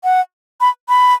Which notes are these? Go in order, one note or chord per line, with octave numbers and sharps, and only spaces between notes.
F#5
B5
B5